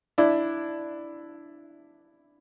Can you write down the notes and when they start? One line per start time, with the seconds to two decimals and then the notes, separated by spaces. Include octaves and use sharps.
0.18 D4 E4